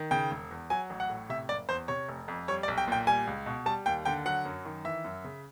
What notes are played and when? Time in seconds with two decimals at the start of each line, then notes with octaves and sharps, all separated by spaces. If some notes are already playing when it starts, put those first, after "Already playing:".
Already playing: D#3
0.11 C#3 G5
0.31 E1
0.51 E2
0.70 F#3 G#5
0.90 A1
1.00 F#5
1.09 A2
1.29 C3 E5
1.49 F#1 D5
1.69 E2 C5
1.88 C3 C#5
2.09 F1
2.28 F2
2.48 G3 C#5
2.63 D5
2.68 B1
2.78 G5
2.88 A#2 G5
3.07 G3 G#5
3.27 C#2
3.46 B2
3.66 G3 A5
3.86 D#2 G5
4.05 D3 G5
4.25 F#3 F#5
4.45 F#2
4.65 D#3
4.84 E3 E5
5.05 F#2
5.24 C#3